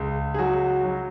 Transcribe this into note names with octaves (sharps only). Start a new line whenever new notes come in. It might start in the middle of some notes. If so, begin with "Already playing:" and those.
Already playing: C#2
G#4
F#3 F#4
F#3